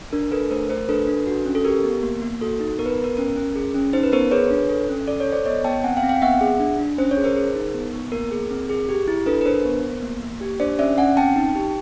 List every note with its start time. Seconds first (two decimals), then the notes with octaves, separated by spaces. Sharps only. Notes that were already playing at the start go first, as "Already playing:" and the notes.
0.13 D4 A#4
0.31 D4 A4 B4
0.51 A3 A#4 C5
0.69 A3 A#4 C5
0.89 D4 A4 B4
1.07 D4
1.27 F#4
1.46 C#4
1.55 A4
1.65 G4 A#4
1.84 B3
2.03 A#3
2.22 A#3
2.41 F#4 A4
2.60 D#4
2.79 B3 A#4
2.86 B4
2.91 A#4
2.98 B3
3.04 A#4
3.17 C#4 A#4
3.36 C#4
3.55 G#4
3.74 C#4
3.93 D#4 C5
4.03 B4
4.13 B3 A#4 C5
4.31 G#4 B4 C#5
4.50 D4
4.69 A4
4.89 C#4
5.08 A4 D5
5.20 C#5
5.27 A4
5.32 C5 D5
5.46 B3 C#5 D#5
5.64 B3 G5 A5
5.84 C4 F#5 G#5
5.96 F5 G5
6.03 C4
6.09 F5 G5
6.22 B3 E5 F#5
6.41 G#4
6.60 D4
6.79 D4
6.98 C#4 C5
7.11 C#5
7.17 G#4
7.24 A#4 C5
7.36 G#4
7.55 D#4
7.75 B3
7.93 B3
8.12 A#3 A#4
8.31 G#4
8.51 C4
8.69 G#4
8.89 G4
9.08 E4
9.26 D4 A4 B4
9.41 B4
9.45 D4 A#4 C5
9.65 B3
9.84 B3
10.03 A#3
10.22 A#3
10.41 G4
10.60 D4 C5 D5
10.79 C#4 D5 E5
10.98 C#4 F#5 G#5
11.17 C4 G5 A5
11.36 D#4
11.55 G4